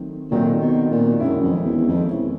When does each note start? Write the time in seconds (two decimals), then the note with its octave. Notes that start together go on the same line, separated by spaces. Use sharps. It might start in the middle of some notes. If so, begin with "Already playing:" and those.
Already playing: D#3 F#3 A3 C4 D#4
0.31 A#2 D#3 F#3 A3 C4 D#4
0.61 B2
0.91 A#2
1.20 F#2 D#3 G#3 C#4 E4
1.43 F2
1.65 E2
1.77 E2
1.88 F2
2.09 E2 D#3 G#3 C#4 E4